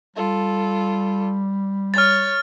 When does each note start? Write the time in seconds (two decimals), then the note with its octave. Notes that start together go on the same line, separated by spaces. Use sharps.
0.16 G3 F4 A4
1.94 C#5 F6 A6